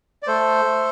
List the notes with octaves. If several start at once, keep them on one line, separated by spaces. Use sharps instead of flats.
D5
A3 A4 C5
A3